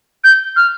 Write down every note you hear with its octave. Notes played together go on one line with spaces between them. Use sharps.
G6
F6